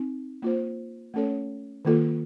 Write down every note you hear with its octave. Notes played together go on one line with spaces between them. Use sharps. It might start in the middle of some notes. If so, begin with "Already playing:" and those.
Already playing: C4 D#4
A#3 F4 C5
A3 C#4 A4 C#5
D#3 A#3 F4 A4